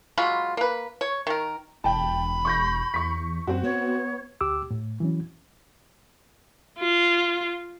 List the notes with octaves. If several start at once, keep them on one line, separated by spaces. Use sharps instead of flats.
F#3 G#3 F4 B5
A#3 B4
C#5
D#3 A#4
E1 G5 A5 B5
C#6 G6 A#6
E2 C#6 B6
F#2 C4 F#4
B3 C#5
D2 G4 D6 E6
A2
E3 F#3 C#4
F4